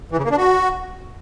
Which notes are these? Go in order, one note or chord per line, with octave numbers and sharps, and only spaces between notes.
E3
C#3
A#3
D4
F#4